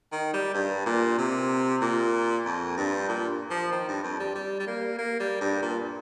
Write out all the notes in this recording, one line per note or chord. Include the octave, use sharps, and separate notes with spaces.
D#3
G3
G2
A#2
C3
A#2
F2
G2
A#2
F3
D#3
G2
F2
G3
G3
G3
A#3
A#3
G3
G2
A#2